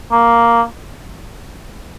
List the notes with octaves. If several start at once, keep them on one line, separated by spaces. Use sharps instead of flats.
A#3